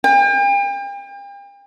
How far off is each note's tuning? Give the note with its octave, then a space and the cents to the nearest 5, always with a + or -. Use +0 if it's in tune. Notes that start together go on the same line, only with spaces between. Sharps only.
G5 +40